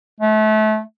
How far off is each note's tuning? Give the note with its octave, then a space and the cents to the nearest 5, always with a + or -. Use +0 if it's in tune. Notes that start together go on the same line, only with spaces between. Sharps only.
A3 -30